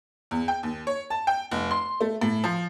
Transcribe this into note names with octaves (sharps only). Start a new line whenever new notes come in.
E2
G5
D#2
C#5
A5
G5
F1
C6
A3
A2
F3